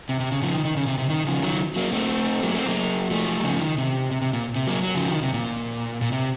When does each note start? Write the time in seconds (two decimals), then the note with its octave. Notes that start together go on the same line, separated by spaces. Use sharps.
0.09 C3
0.20 C3
0.32 C#3
0.42 C#3 F3
0.53 D#3
0.65 D#3
0.77 C#3
0.87 C3
0.98 C3
1.10 D#3
1.27 C#3 F3
1.42 D#3 F#3
1.76 F#3 A#3
1.93 A3 C4
2.43 F#3 A#3
2.54 A3 C4
2.66 F#3 A#3
3.11 F3 A3
3.40 F#3
3.44 C#3 F3
3.61 D#3
3.78 C3
4.11 C3
4.22 C3
4.33 A#2
4.56 C3
4.67 F#3 A#3
4.83 F#3
4.95 C#3 F3
5.11 D#3
5.22 C3
5.34 A#2
6.02 A#2
6.12 C3